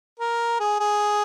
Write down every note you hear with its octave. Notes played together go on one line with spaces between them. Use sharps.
A#4
G#4
G#4